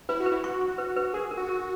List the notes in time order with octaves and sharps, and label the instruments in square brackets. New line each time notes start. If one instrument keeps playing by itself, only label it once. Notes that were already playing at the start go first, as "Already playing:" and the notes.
[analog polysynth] E4 [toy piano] B4
[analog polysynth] F#4
[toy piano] B4
[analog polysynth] E4
[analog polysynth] F#4 [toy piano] C#6
[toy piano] C#6
B4
B4
[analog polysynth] G#4 [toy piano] A#4
[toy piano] A#4
[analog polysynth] F#4
[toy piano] A#4